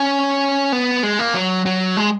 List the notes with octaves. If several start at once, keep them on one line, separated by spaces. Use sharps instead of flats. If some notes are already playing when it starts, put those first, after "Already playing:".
Already playing: C#4
B3
G#3
A#3
F#3
F#3
G#3